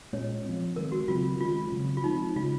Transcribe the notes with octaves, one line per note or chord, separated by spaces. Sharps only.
A#2 G#3 C#4 C#5
F3 C4
D#3 G#3 C4 A#4
F#4
C#3 F#3 C4 F4
D#3 G#3 C#4 F4
C#3 F#3 C4
F4
F3 G#3 C4 D#4
C#3 G#3 C#4 F4